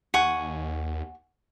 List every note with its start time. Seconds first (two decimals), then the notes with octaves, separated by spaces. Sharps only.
0.14 D#2 F#5 G#5 C#6